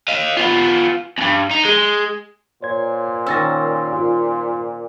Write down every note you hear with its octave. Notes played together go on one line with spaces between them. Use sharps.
D#5 F5
B3 F4
E2 G2
D#4
G#3
A#2 C5 C#5 G#6
D#3 C#4 E6 A6 A#6
F4